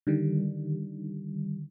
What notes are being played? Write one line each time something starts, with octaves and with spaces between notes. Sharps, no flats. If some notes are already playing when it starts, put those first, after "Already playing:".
D3 D#3 G3